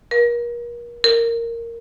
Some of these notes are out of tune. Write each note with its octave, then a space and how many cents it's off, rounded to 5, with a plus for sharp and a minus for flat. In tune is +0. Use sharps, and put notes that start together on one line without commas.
A#4 +35
A#4 -10